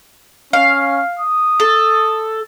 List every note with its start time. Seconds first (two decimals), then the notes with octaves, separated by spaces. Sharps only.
0.53 C#4 F5
1.19 D#6
1.60 A4